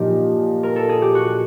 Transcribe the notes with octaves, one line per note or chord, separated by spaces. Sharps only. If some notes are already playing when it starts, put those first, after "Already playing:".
Already playing: A#2 F3 D#4 G4
A#4
A4
G#4
G4
F#4